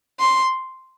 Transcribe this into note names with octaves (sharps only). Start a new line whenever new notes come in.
C6